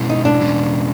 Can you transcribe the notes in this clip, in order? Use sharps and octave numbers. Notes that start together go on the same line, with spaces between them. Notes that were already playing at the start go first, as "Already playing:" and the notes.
Already playing: B2 G#3 C#4 E4
D#4
D4
E2 B2 G#3 C#4